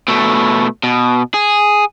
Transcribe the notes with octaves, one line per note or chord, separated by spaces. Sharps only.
B2 A3
B2
G#4